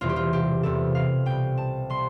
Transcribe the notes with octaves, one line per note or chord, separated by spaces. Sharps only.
E1 E2 C3 E3 G3 F4
G4
F4
G4
E2 C3 G3 A4
F5
C2 B2 G3 G5
A5
C3 G3 C6